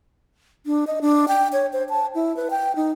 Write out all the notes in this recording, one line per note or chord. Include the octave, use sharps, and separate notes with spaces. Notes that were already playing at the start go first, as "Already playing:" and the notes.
D4
D#5
D4
G5
C#5
C5
A5
E4
B4
G5
D#4